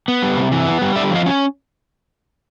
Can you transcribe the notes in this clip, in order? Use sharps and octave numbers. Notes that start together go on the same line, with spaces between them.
B3
G3
C3
E3
B3
G3
D3 D5 E5
F3 D#5 F5
C#4